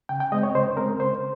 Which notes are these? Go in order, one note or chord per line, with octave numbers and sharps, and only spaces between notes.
C#3 G5
G5
G#3 C4 D#5
C#5
C#3 C5
G#3 C4 A#4
C#3 C5